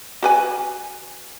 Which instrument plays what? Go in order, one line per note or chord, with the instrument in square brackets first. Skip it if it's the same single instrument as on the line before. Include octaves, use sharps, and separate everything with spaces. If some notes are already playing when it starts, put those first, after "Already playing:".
[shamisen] F#4 B4 G#5